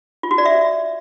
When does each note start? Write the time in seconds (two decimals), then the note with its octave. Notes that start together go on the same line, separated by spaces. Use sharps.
0.23 F4
0.31 F#4
0.38 D5
0.46 E5